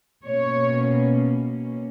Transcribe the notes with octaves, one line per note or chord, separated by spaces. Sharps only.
B2 A#3 C#4 C#5